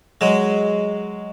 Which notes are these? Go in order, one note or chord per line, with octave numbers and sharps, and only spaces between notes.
F#3 G#3